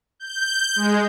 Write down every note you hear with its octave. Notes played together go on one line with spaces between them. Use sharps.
G6
G#3